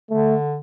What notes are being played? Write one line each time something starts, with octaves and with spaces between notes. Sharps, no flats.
D3 A3